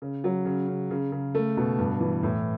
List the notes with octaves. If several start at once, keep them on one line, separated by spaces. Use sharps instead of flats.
C#3
F#3
C#3
C#3
C#3
C#3
A3
B2
G2
E3
A2